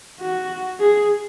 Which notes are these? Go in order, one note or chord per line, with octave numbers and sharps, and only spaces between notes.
F#4
G#4